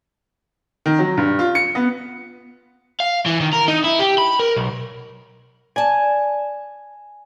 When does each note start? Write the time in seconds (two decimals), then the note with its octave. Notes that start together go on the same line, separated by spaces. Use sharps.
0.86 D#3
0.99 F#3
1.18 G2
1.39 F4
1.55 C#7
1.75 B3
3.00 F5
3.26 E3
3.41 D#3
3.53 A#4
3.68 D#4
3.84 E4
3.99 G4
4.18 B5
4.40 A#4
4.57 B1
5.76 D5 G#5 A5